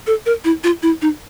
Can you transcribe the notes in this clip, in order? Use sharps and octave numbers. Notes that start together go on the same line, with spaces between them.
A4
A#4
E4
F4
E4
D#4